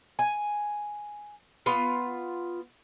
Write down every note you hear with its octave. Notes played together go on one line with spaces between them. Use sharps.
G#5
B3 F4